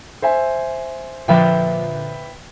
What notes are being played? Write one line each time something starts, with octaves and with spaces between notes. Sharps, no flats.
C5 E5 G#5
A#2 D3 F3 B4 E5 G5